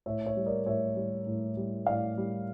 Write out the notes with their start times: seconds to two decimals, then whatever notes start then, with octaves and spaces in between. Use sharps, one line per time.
0.06 A2 C#5 E5
0.26 C#5 E5
0.36 G3
0.46 A#4 D5
0.66 A2 C#5 E5
0.96 G3
1.27 A2
1.57 G3
1.86 A2 D5 F5
2.18 G3